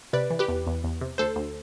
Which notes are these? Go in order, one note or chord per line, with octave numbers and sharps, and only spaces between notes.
C3 B4 D5
E3
G4 B4
E2
E2
E2
C3
D2 A4 C5
D2